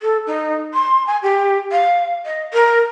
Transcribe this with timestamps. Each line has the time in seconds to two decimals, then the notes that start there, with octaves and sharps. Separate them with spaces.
0.02 A4
0.27 D#4
0.74 C6
1.07 G#5
1.23 G4
1.72 F5
2.26 D#5
2.54 A#4